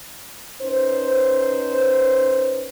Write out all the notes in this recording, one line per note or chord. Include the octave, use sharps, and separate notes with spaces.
C#4 D#4 B4 C5